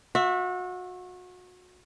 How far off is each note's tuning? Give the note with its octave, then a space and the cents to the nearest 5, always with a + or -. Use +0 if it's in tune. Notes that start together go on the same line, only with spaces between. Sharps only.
F#4 -30 E5 +0